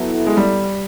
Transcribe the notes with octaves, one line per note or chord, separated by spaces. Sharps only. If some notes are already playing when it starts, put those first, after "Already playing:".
Already playing: F#3 B3 E4 A4
G#3
G3